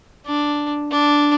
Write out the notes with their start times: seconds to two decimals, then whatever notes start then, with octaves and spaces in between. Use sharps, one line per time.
0.26 D4
0.91 D4